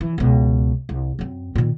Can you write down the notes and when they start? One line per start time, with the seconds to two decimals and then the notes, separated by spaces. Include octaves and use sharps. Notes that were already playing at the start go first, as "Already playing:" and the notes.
0.01 E3
0.18 C#2 B2
0.89 C2
1.19 F#2 C4
1.55 A#2 D#3